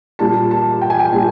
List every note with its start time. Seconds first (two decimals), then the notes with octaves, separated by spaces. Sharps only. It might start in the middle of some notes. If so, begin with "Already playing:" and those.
0.19 A#2 G3 A5
0.51 A5
0.81 G5
0.90 G#5
0.99 G5
1.12 A#2 G3